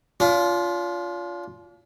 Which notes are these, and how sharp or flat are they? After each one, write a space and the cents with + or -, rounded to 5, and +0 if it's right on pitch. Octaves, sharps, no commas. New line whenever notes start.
D4 -45 F4 +0